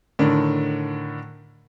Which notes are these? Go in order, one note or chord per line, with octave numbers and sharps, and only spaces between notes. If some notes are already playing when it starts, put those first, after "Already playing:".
A2 D3 D#3